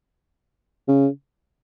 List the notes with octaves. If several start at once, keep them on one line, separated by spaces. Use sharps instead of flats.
C#3